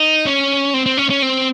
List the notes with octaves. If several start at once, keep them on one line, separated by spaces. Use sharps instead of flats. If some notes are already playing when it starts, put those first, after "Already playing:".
Already playing: D#4
C#4
C4
C4
C#4
C#4
C4